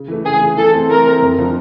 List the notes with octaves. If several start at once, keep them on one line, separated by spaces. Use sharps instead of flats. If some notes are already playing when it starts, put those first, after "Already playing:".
Already playing: C#3
E3 A3
C#3 G#4
E3 A3
E3 A4
A3 C4
E3 A#4
A3 C4
F2
D3 F3